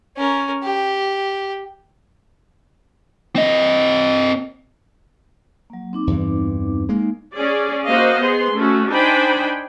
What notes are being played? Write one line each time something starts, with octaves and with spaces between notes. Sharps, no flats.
C#4 A#4
G4
C4 D#5
F#3 A#3
C4 D#4 D6
E2 G2 E3
G#3 A#3 D#4
C#4 G#4 D5
A#3 F#4 C5 D#5 F5
B3 G#4 C6
A3 C#4 F#4
D4 D#4 C5 G5 G#5 B5